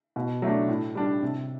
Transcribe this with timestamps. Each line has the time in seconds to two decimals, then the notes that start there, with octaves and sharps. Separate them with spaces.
0.16 B2
0.42 F#3 A3 D4
0.68 A2
0.95 G3 D4
1.23 C3